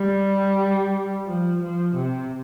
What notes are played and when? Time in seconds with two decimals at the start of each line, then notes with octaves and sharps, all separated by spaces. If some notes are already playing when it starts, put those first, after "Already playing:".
Already playing: G3
1.26 F3
1.61 F3
1.95 C3